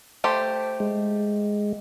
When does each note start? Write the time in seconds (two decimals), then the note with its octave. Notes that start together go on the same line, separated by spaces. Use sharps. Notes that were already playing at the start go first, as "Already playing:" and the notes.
0.24 A3 G4 C5
0.80 G#3